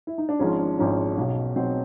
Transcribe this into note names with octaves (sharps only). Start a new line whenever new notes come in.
E4
D#4
D4
G#1 G#2 F3 C#4
D4
G#1 G#2 F3 C#4
B1 B2 F#3
B1 B2 F#3 C4